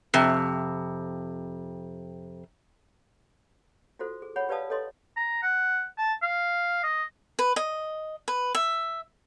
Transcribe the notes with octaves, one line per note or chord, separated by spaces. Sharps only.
F2 C3
F4 F#4 A4 C5
G#4
G#4 C#5 F#5 B5
G4 B4 D5 F5 A5 D#6
A4 C#5 D#5 C6
A#5
F#5
A5
F5
D#5
B4
D#5
B4
E5